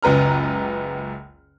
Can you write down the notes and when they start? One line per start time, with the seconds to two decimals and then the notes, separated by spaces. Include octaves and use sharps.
0.03 F#1 C#2 B4 A#5 F6